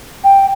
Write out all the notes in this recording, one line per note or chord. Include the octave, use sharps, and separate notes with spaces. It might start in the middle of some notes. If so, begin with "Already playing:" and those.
G5